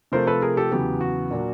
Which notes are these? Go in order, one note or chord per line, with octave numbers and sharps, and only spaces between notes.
C3 F3 A3 A#4 C5
A4 B4
G#4 A#4
G4 A4
E2 C#3 F#3 B3 G4
F#4
A#2 F#3 A#3 D4